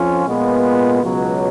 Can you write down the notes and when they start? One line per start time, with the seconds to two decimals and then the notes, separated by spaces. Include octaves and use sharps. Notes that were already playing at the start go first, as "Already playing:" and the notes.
Already playing: F2 F3 C#4 F4
0.26 A#2 G#3 B3 F4
1.01 C#2 B2 F#3